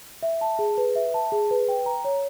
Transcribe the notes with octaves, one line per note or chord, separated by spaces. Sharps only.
E5
A5
G#4
B4
E5
A5
G#4
B4
G5
A#5
C#5